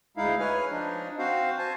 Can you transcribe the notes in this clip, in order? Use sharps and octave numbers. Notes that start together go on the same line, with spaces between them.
D2 G#3 D#4 E4 F5
B4 C#5 G#5 F6
F3 D4 D#4
C4 F#4 C5 F5
C5 G#5 A5